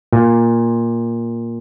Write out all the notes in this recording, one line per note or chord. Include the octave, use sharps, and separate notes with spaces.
A#2